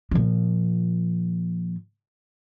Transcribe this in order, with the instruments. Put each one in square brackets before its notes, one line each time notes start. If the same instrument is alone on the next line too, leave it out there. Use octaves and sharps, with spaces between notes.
[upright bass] A#2 F3